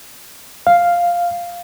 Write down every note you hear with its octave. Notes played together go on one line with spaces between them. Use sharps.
F5